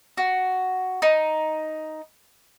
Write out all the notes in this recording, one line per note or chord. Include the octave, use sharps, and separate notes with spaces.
F#4
D#4